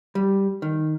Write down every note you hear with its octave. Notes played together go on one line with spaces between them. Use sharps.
G3
D#3